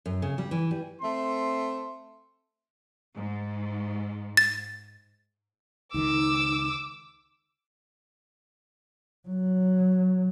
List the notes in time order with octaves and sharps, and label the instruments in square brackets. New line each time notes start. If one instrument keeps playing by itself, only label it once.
[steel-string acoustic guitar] F#2
C#3
G3
E3
G3
[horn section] A3 C4 C6
[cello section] G#2
[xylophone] A6
[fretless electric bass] C#2 D#3 [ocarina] D#4 [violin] D6 E6
[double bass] F#3